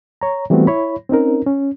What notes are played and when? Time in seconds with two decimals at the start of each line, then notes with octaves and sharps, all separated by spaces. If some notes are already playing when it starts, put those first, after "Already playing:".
0.21 C#5 A#5
0.50 E3 G3 A3 B3 C4 F#4
0.67 E4 C#5 B5
1.09 C4 C#4 D#4 A#4
1.46 C#4